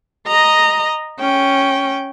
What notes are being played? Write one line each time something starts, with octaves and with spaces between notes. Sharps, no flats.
D#5 A#5
C#4 G5